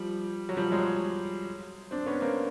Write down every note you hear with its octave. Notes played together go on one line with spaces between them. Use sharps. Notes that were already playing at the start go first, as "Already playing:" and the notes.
Already playing: F3 G3
F#3
F3 G3
F#3 G#3
C4 D4
B3 C#4
A#3 C4